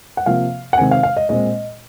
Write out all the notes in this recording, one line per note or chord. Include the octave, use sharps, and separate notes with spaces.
F#5
C3 F3 A#3 F5
F#5
C3 D#3 G#3 C4 G#5
F5
F5
D#5
A#2 G#3 C4 D#5